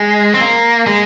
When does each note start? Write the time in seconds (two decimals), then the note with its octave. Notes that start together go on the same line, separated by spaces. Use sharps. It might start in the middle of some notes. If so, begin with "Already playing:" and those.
Already playing: G#3
0.34 C4
0.41 A#3
0.87 G#3